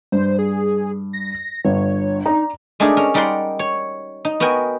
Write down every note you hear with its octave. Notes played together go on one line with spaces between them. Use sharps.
G2 C5
G#4
A#6
G1 C#5
D#4 D5 A#5
G#3 A3 D4 D#4 G#4 A#4
C#4 A#4
G3 D#4 A#4 D5 F#5 C6
C#5
D#4
B3 F#4 A#4 G5 G#5